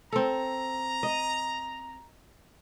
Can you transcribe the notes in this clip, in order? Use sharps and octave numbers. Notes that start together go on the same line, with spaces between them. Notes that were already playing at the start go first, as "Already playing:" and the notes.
C4 A4 A#5
D#5